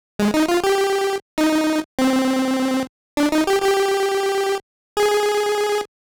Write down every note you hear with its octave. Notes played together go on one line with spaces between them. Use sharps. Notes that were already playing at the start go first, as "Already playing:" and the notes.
G#3
D#4
F4
G4
D#4
C4
D4
D#4
G4
G4
G#4